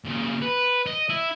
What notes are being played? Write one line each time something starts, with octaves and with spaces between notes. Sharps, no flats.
A#2 C#3
B4
D#5
E4